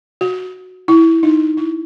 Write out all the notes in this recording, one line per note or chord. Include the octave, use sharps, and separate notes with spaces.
F#4
E4
D#4
E4